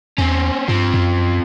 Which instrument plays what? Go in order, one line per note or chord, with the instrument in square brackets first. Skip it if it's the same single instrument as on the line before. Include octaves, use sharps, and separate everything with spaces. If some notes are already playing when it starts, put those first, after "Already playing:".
[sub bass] E2 [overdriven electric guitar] C4 C#4
[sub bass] G2 [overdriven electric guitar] F3 C4
[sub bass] F#2